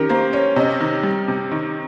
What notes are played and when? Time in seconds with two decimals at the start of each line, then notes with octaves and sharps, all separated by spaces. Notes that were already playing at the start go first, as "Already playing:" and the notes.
Already playing: D#3 C#4 G4 A#4
0.09 A#3 C5
0.33 C#4 C#5
0.56 C3 D#5
0.80 D#3
1.03 G3
1.28 C3
1.52 D#3